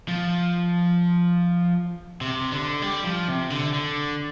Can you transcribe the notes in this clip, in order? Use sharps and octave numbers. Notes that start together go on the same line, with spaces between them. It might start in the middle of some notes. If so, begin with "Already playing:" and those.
F3
C3
D3
G3
F3
C3
D3
D3